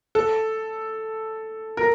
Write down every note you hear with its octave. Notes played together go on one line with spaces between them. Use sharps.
A4
A#4